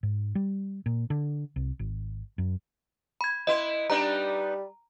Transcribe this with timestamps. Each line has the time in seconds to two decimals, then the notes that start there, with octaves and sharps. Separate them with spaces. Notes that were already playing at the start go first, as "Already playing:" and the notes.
0.03 G#2
0.35 G3
0.86 A#2
1.10 D3
1.56 C2
1.79 G#1
2.38 F#2
3.21 B5 G#6
3.47 B3 E4 D#5 C6
3.90 G3 B3 D4 D#4 A#5